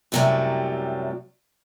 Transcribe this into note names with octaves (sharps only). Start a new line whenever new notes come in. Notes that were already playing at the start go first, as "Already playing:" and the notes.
F#2 A2 C3 D#3 F#3 G3